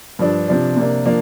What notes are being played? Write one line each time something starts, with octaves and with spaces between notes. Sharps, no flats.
G2 F3 D4
C3 F3 D4
C3 A#3 D4
F3 A#3 D4